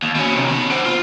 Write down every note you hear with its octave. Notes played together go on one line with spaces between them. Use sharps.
D#2
B2 C#4
C3 D#3
B2 B5
D4 C5
F4